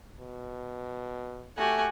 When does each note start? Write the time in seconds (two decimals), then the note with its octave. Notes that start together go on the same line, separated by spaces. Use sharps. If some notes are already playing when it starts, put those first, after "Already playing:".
0.20 B2
1.57 A3 F#4 G4 F#5 G#5